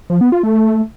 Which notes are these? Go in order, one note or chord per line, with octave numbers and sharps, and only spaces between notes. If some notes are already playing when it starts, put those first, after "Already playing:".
F3
B3
F4
A3